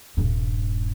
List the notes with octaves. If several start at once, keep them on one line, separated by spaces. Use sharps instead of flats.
D#1 G2